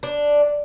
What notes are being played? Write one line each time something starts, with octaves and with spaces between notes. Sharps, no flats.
D4